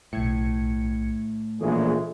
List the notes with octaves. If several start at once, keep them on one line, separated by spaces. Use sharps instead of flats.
B1 A2 G#6 C#7
A#1 C#3 E3 G#3 A4 E5